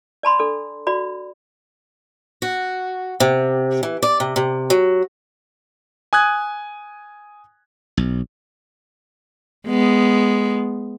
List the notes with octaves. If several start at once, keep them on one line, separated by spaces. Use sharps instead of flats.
D5 A5 B5 C6
D4 A4 D5
F#4 D5 B5
F#4
C3
E3
D5
C3
C3
F#3
G#5 D#6 F#6 G#6
B1
G#3 B3